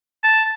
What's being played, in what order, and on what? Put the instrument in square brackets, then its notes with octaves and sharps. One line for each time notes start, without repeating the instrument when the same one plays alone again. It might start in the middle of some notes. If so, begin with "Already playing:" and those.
[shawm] A5